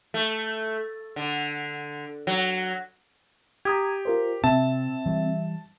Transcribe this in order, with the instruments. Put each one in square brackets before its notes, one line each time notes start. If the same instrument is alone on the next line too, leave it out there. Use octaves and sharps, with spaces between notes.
[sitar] A3
D3
F#3
[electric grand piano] G4 [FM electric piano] A#5 D#6 G#6
[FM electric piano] F4 A#4 C5
[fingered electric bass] C3 [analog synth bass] C4 [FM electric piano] E5 [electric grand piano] A5
[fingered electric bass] E3 G3